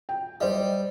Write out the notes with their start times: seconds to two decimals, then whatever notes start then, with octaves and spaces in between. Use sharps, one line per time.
0.09 G5
0.41 G3 C5 D#5